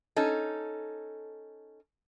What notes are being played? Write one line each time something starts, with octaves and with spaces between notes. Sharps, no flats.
C#4 D#4 A4